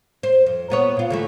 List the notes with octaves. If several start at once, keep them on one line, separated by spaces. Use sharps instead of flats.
C5
F2
A#2 B3 C#5
A#2 F4
D3 E3 A3